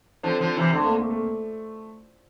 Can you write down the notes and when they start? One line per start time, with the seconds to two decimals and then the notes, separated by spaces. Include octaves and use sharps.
0.23 D3 F3 C4
0.41 D3 F3
0.57 C3 E3
0.73 D3 A3
0.85 A#3
0.97 A3
1.10 A3